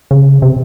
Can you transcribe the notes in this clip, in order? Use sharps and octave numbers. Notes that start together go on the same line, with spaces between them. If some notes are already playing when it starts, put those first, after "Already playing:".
C#3
C3